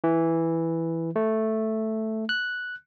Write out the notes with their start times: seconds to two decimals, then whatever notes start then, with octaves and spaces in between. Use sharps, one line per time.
0.04 E3
1.16 A3
2.29 F#6